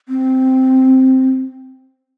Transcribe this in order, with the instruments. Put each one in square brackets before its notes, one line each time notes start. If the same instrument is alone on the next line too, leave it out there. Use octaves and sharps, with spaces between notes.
[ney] C4